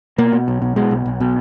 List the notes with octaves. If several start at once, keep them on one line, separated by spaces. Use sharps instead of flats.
B2 A#3
B2
B1
B2
B2 G#3
B1
B1
B2